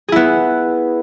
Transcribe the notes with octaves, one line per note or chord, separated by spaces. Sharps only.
B3 E4 G#4